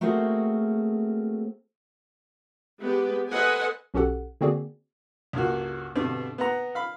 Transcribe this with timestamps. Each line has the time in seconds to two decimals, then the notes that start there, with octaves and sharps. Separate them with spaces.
0.01 A3 A#3 C4 F#4 G#4 C5
2.81 G#3 B3 G4 B4
3.32 A4 B4 C5 D#5 F#5 G#5
3.94 B1 C#4 F#4 G4 A4 F#5
4.41 D3 A#3 C4 F#4 G#4 D5
5.33 C#2 G2 A#3 F#4
5.95 G2 B2 D3 C4
6.38 B3 F#5 A#5
6.75 F5 B5